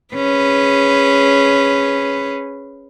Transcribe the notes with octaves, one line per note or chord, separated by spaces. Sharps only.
C#4 G#4 B4